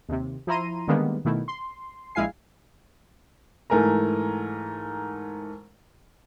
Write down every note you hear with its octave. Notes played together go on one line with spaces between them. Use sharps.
D#2 C3
F3 E4 A#5 C6 D#7
D3 D#3 G3 G#3 A#3 B3
B2 D#3 A3 E4
C6
A#1 G#3 E4 F5 G#5 C7
G#2 E3 A3 A#4 G#5 A#5